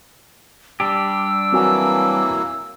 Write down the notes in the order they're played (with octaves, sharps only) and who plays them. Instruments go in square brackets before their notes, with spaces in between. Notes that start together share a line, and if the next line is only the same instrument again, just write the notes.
[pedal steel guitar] G3 D4 G4 [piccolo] E6
[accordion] E3 F#3 A#3 [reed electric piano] C4 F#4 G#5